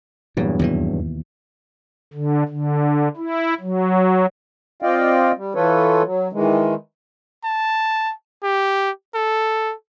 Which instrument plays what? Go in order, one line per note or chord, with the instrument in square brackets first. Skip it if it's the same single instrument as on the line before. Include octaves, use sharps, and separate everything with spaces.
[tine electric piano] E2 G2 F#3 [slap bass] A#2
[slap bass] D#2 B2 E3
[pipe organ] D3
D3
E4
F#3
[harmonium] C4 F4 D5 D#5 F5 G5
G3
E3 F4 A4 B4 C#5
F#3
D#3 E3 G#3
[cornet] A5
G4
A4